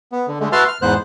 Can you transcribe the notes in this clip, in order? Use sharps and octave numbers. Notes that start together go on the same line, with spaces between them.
B3
D3
D3 G#3 A3
F#4 B4 E5 A5 C6 F6
F6
E2 G#2 B3 C5 F#6